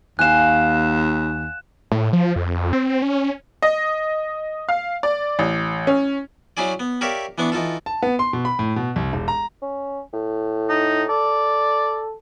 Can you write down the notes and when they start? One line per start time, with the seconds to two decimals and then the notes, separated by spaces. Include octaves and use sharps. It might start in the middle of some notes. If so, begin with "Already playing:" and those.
0.19 D#2 F5 F#5 G#5 F#6 E7
1.92 A2
2.13 F3
2.36 F2
2.73 C4
3.02 C#4
3.62 D#5
4.69 F5
5.03 D5
5.39 A1
5.87 C#4
6.57 F#3 C#4 E4 G#4 D5
6.80 B3
7.01 G4 A#4 C#5 D5 E5 F5
7.38 E3 B3 D4 E4 C#6
7.52 E3 D#4 F4 A4
7.86 A5
8.03 B3
8.19 C6
8.33 B2
8.45 B5
8.59 A2
8.76 B2
8.96 C2
9.13 E1
9.28 A#5
9.62 C#4
10.13 A2
10.69 D#4
11.09 A4 D5